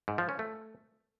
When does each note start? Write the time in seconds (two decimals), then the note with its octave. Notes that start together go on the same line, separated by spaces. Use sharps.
0.08 G#2
0.18 F3
0.29 C#4
0.39 A3